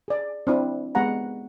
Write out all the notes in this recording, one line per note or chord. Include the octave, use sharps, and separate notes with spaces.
G#4 D5
C4 D4 E4
G#3 B3 G4 F#5 A#5